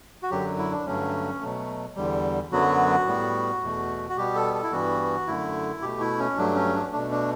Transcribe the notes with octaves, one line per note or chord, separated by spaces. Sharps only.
F#4
F#2 D3 F#3 G4
E4
D4
G2 D3 F#3 A3 C#4
B2 F#3 A3
E2 D3 G3
F#2 D3 F#3 B3 F#4
A2 G3 B3
E2 B2 A3
F#4
B2 G3 B3 G4
A4
A4
E4
G2 E3 G3 B3 F#4
F#2 D3 A3 E4
B2 A3 G4
E4
C#4
G2 F#3 A3 D4
C#4
D4
B2 A3 D4
D4